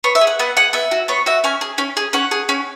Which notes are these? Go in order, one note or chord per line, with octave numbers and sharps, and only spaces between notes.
B3 C#5
E5
G#4
F#5
B3 F#5
G#4 F#5
B3 E5
F#4
B3 C#5
F#4 E5
C#4 G#5
G#4
C#4
G#4
C#4 F#5
G#4
C#4